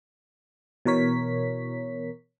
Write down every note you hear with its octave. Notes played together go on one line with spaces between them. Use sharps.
B2 E3 A#4 C#5 B6